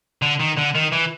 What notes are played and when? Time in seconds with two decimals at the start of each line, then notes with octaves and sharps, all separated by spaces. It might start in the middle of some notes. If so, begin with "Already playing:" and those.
0.22 D3
0.40 D#3
0.58 D3
0.75 D#3
0.92 E3